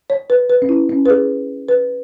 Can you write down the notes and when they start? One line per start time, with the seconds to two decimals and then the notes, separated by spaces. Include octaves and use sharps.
0.10 C#5
0.30 B4
0.50 B4
0.62 C#4
0.69 E4
0.90 C#4
1.06 B4
1.10 G#4
1.69 B4